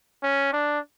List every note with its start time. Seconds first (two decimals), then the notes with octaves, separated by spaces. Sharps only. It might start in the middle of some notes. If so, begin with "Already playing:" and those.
0.23 C#4
0.53 D4